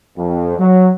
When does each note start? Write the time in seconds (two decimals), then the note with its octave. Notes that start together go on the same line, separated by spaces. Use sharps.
0.17 F2
0.58 F#3